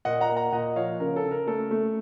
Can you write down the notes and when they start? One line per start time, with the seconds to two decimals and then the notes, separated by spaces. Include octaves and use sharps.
0.05 A#2 D#5 F#5
0.21 F#5 A#5
0.29 A#3
0.37 F#5 A#5
0.52 A#2 D#5 F#5
0.76 F3 C#5 F5
1.00 C#3 A#4
1.16 A4
1.24 C#3
1.31 A#4
1.47 A3 A4
1.71 A3